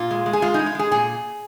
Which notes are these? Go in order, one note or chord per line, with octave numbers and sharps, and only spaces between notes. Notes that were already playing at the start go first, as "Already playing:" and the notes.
Already playing: A#2 F4
G#3
G#3
G#4
G#3 F4
D#4
G#3
D#4
G#3 G#4
A#2 G#4